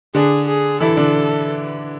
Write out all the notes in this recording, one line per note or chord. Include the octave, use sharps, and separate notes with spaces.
D3 D4 G#4
G#4
E3 E4 A4
D3 D4